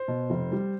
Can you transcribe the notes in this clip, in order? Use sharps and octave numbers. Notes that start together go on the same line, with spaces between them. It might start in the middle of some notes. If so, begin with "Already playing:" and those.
Already playing: C5
B2
F1
G3